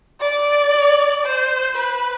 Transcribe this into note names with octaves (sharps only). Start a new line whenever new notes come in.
D5
C5
B4